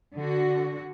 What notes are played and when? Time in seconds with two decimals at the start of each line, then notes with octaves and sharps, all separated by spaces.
0.17 D3 F#4